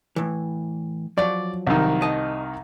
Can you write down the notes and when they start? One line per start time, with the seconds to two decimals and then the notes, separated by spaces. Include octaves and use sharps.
0.16 A2 E3
1.18 F3 F#3 D5
1.67 C2 D#3
2.02 D#5 A5